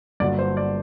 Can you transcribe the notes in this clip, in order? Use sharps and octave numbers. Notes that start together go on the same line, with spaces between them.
G1 G2 D3 F#3 A#3 D5
C5
D5